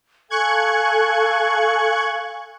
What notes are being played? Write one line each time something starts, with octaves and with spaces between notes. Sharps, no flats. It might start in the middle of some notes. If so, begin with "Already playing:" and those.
A4 F5 G#5 C#6 F#6 G#6